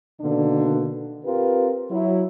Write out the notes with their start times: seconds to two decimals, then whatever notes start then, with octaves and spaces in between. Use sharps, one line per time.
0.21 B2 D3 D#3 A#3 D4
1.25 C4 F4 G4 A#4 B4
1.91 F#3 E4